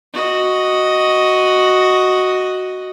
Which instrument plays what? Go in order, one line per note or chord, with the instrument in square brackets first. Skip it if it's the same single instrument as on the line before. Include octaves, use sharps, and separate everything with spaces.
[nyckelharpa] F#4 D#5